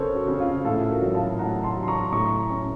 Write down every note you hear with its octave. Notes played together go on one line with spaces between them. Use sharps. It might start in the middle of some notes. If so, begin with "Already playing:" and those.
Already playing: F2 C#3 A4 A#4 C5 C#5
F#4
C#3
F4
A2 F4 A4
F#4 A#4
F#3
F5 A5
A5
A2 F#5 A#5
A5 C6
F#3
C6
A#5 C#6
A2 A#5 C#6
C#4